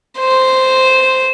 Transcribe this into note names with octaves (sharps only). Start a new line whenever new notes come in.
C5